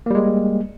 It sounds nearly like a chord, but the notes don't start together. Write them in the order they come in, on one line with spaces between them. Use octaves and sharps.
A#3 G3 G#3